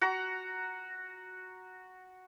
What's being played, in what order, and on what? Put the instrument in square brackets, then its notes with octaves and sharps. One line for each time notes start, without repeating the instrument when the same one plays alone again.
[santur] F#4 F#5 A#5